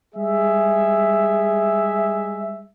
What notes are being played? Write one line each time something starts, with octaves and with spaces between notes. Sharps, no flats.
G3 G#3 G#4 E5